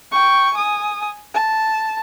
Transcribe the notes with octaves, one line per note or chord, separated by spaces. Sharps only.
G5 C#6
G#5 D#6
A5